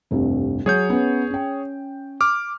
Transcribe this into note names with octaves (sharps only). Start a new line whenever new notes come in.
F1 C2 G2
F#3 G#4 C#5 G6
B3 C#4
C#4 G5
D6 F6